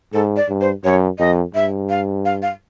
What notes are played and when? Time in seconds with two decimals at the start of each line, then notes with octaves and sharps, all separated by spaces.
0.13 G#2 A4
0.36 D5
0.49 G2
0.61 C5
0.84 F#2 C#5
1.19 F2 D#5
1.54 G2 E5
1.89 F5
2.25 F5
2.42 F5